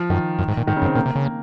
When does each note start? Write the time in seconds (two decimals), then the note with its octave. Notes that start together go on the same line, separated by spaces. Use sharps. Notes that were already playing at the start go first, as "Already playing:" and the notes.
Already playing: F3
0.10 F#2 D#3
0.39 F#2
0.48 G#2
0.57 A#2
0.67 G#2 D#3
0.76 C#3
0.82 F#2
0.86 C4
0.95 A#2 A#3
1.06 C3
1.16 C#3
1.25 A#3